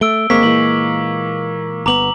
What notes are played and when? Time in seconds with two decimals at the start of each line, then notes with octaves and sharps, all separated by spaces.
0.01 A3 E6 D7 G7
0.30 G1 G#3 A#3 C4 C#6 B6
0.43 A#2 E3 G#3 F#7
1.86 G1 B3 A#5 D6 F#7